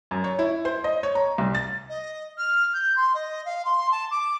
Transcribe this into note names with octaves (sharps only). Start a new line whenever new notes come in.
F#2
C#5
E4
C5
D#5
C#5
A#5
C2
A6
D#5
F6
G6
C6
D#5
F5
C6
A5
D6